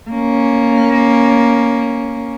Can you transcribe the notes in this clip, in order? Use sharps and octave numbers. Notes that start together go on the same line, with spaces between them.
A#3 C#4